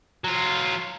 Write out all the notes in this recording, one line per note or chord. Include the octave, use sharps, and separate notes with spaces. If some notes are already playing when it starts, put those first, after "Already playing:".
F#3 F4